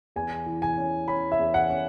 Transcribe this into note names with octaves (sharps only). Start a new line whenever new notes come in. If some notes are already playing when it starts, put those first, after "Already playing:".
E2 G#5
E3
G#5
C#4
C#4 B5
E5
E2
F#5
C#4